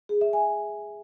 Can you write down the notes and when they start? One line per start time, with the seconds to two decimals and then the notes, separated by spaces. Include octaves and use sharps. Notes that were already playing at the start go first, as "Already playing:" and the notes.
0.09 G#4
0.21 E5
0.33 G#5